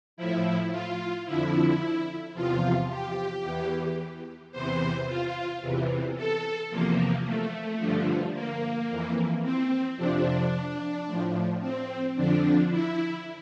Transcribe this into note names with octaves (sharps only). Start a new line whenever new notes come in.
A2 F3 E4
F4
F2 D3 F3 E4
E2 C3 F3 F4
G4
E2 E3
E2 C3 E3 C5
F4
E2 C3 E3
A4
E2 C3 F3 A#3
A3
G2 D3 F3
A#3
F2 E3
C4
F2 C3 F3 D4
A2 F3
C4
F2 D3 F3 D4
E4